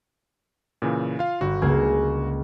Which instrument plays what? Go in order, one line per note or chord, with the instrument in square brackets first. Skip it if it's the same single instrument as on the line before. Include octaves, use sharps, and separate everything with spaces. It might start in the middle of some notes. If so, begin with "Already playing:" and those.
[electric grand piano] A#2 C#3 E3
F4 F5
[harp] G1 [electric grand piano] F#4
[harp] C#2 A#3 G#4